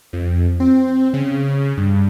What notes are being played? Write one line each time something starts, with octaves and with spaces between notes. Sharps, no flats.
F2
C4
C#3
G2